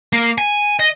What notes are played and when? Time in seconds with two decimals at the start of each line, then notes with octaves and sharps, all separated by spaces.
0.13 A#3
0.38 G#5
0.79 D#5